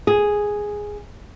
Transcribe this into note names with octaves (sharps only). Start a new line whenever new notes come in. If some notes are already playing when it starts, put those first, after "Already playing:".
G#4